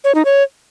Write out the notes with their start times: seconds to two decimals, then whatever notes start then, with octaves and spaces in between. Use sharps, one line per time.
0.04 C#5
0.15 D#4
0.25 C#5